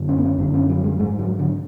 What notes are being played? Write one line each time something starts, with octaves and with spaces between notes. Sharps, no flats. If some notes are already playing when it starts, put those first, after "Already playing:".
Already playing: F#2 D3
C#4
B3
C#4
F#2 D3 D4
C#4
F#3
G#3
G#2 G#3
F#3
D3